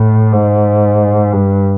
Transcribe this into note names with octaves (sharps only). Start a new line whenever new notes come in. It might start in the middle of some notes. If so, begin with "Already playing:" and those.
Already playing: A2
G#2
G2